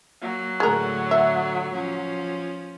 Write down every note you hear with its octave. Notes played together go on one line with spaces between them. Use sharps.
F#3 A#3
A2 D3 G#3 A3 A#4
E5
F3 C#4